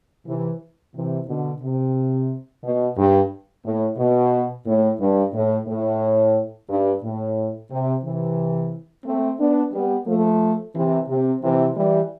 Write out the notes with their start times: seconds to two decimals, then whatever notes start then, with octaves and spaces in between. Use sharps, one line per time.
0.26 C3 E3
0.94 C3 E3
1.27 B2 D3
1.61 C3
2.63 B2
2.96 G2
3.64 A2
3.98 B2
4.66 A2
4.99 G2
5.33 A2
5.67 A2
6.68 G2
7.02 A2
7.70 C3
8.03 C3 E3
9.05 A3 C4
9.39 B3 D4
9.73 G3 B3
10.06 F3 A3
10.74 C3 E3
11.08 C3
11.42 C3 E3
11.76 E3 G3